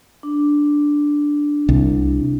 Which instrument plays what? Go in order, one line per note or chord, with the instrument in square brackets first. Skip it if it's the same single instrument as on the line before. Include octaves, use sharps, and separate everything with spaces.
[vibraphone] D4
[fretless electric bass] C2